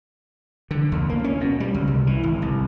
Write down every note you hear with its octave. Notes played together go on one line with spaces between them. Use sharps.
D3
D#2
A#3
C#4
B2
G3
C#2
C2
E3
G#1
C2